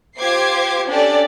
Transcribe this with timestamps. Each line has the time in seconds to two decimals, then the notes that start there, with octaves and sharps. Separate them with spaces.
0.17 F4 G4 C5 D6 G#6 C7
0.87 C#4 D4 G4 A4 D5